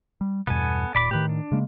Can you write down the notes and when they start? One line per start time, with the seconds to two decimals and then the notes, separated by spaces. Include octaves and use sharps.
0.21 G3
0.47 E2 G2 B2 B3 A4 G#5
0.95 D#1 B1 A#2 D5 B5 D6
1.11 A2 D#3 G4 B4
1.29 D4
1.52 C#3 G#3 A#3